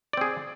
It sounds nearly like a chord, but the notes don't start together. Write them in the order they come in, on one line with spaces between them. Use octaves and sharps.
D5 C4 G#4